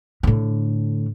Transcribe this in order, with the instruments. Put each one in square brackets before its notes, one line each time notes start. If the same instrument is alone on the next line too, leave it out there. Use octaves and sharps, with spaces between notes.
[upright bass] A2 D3